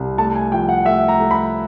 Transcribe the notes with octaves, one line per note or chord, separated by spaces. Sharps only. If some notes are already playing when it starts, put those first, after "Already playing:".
Already playing: C2
A3 A5
G#5
F3 G5
F#5
A3 E5
A#5
A3
B5